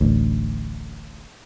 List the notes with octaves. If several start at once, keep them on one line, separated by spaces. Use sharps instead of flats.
D1 A1 D2